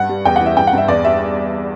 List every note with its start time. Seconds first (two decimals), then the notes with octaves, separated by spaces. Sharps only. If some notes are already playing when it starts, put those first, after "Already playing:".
Already playing: G2 F#5
0.09 G3
0.25 E2 G5
0.36 E3 F#5
0.46 E5
0.57 G2 G5
0.67 F#5
0.73 G2 E5
0.88 E2 D5
1.05 G3 E5